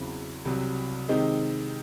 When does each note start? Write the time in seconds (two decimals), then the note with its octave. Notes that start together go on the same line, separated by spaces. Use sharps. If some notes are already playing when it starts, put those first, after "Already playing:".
Already playing: E2 C#3 F#3 C4 E4
0.45 C2 C3 F#3
1.09 C3 D#3 G#3 C4 D#4